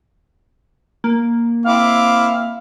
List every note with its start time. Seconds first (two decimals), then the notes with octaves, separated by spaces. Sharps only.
1.04 A#3
1.65 C4 E4 F5 D6